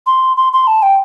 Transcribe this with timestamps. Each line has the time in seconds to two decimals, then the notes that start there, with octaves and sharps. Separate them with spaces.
0.07 C6
0.37 C6
0.53 C6
0.67 A5
0.83 G5